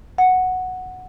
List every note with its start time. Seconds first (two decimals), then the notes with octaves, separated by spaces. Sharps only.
0.18 F#5